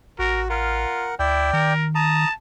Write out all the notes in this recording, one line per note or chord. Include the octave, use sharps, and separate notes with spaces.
A1 F#4 A#4
F4 A#4 F#5
D2 E4 D5 G5
D#3 A#4
A5 A#5 D#6